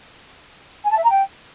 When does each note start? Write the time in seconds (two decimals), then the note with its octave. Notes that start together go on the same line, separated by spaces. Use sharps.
0.84 G#5
0.90 A5
0.97 E5
1.03 A#5
1.10 G5